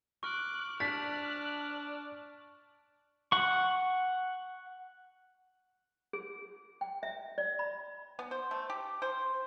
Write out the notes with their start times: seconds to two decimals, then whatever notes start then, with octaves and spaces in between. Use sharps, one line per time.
0.23 C#6 D6 F6 F#6
0.80 D4 F6 F#6 A6 B6
3.32 F#5 C#6
6.13 G#4
6.81 G5
7.03 E5
7.38 D5
7.59 B5
8.19 B3
8.31 C5
8.51 A3
8.70 G4
9.02 C5